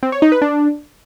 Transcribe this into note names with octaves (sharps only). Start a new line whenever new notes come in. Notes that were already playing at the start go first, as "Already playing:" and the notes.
C4
C#5
D#4
B4
D4